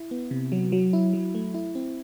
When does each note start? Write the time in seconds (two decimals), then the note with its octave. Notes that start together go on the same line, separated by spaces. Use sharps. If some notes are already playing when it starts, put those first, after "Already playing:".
Already playing: E4
0.11 B3
0.31 C3
0.52 F#3
0.72 F#3
0.93 E4
1.13 F#3
1.35 A3
1.54 E4
1.75 C4